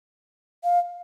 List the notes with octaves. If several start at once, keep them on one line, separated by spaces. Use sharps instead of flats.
F5